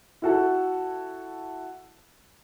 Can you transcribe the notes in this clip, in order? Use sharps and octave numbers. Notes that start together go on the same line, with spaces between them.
E4 F#4 A4